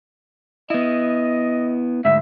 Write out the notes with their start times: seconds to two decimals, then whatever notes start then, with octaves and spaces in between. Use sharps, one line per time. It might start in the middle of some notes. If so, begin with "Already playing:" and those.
0.70 B3 E4 D#5
2.05 D2 G#2 E5